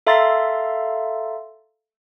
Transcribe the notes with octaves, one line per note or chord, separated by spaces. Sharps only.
A4 E5 F5 A#5 C6 A6